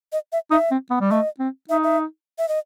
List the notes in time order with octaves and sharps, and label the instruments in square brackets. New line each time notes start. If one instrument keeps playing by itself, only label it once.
[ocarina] D#5
E5
[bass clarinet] D#4 [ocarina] E5
[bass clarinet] C4
B3
G3
[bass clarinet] A3 [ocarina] D#5
[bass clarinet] C4
[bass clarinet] D#4 [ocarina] E5
[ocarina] E5
E5
D#5